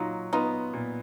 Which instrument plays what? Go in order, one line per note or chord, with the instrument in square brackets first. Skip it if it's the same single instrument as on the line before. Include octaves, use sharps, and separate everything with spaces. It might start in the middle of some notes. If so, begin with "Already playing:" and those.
Already playing: [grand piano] A#2 F#3 [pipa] D#4 F4
[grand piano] B3 [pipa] D#4 F4
[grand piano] A#2